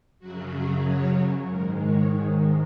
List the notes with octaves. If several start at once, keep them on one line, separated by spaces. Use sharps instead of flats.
F#2 C#3 F#3 F#4
G#4
C#5
G#2 D#3 G#3 A#4
C#5